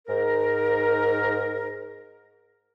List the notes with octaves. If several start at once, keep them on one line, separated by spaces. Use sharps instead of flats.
G#2 A#4